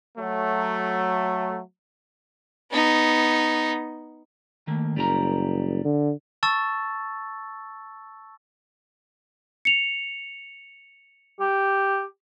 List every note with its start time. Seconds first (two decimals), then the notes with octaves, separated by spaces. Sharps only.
0.18 F#3 A3
2.72 B3 D#4
4.67 D#3 A3 A#3
4.96 F#1 G3 A#4 A#5
5.85 D3
6.43 A5 C#6 E6 A6
9.65 C#7 F7
11.40 G4